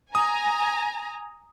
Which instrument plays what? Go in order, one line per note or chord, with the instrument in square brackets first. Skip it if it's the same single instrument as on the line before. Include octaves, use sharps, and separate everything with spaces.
[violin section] G#5 A#5 [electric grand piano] D#6